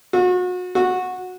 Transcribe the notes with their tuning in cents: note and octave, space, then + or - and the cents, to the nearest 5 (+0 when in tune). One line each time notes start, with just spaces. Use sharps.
F#4 -35
F#4 -15